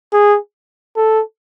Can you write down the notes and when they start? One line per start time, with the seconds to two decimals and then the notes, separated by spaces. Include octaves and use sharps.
0.13 G#4
0.97 A4